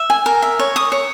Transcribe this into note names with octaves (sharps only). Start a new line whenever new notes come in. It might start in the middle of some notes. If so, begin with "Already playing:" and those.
Already playing: E5
G#5
A#4
E5
C#5
D#6
C#5